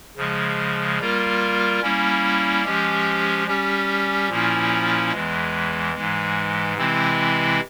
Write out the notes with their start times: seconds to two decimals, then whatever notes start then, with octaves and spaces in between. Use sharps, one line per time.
0.17 C#3 F3 G#3
0.99 G3 A#3 F4 A#4
1.82 G3 A#3 C#4 E4
2.65 F3 G#3 C#4 G4
3.47 G3 C#4 G4
4.29 A#2 F3 A#3 C#4 E4
5.12 E2 E3 G#3
5.94 G#2 E3 G#3
6.77 C3 E3 G#3 C4 E4